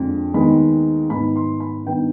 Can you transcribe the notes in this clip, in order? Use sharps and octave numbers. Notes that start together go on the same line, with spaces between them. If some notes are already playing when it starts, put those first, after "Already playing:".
Already playing: F2 D3 G#3
D#2 D#3 G#3 B3 B5
G#2 D#3 B3 B5
C6
B5
G2 D#3 B3 G5